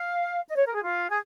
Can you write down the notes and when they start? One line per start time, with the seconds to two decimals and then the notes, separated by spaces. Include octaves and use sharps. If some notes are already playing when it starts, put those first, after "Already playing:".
Already playing: F5
0.47 D#5
0.56 C#5
0.65 A#4
0.74 G#4
0.82 F4
1.09 G#4